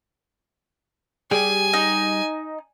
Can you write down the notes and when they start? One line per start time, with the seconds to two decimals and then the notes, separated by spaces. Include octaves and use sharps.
1.31 G3 G4 G#4 G#5
1.73 D#4